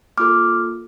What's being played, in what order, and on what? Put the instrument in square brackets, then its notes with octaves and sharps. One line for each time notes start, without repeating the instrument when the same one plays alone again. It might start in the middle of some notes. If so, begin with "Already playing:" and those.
[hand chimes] A#3 F4 A4 D6 F6